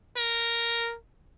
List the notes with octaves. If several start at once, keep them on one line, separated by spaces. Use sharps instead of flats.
A#4